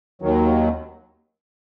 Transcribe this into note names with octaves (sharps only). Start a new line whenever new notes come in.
D#2 D#3 F#3